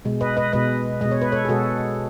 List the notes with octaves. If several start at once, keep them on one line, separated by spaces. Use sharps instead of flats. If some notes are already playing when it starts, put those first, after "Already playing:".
B2 G#3
B4 D#5
B4 D#5
B2 G#3 B4 D#5
B2 G#3 D#5
C#5
B4
A4 C#5
G#4
B2 G#3 F#4 A4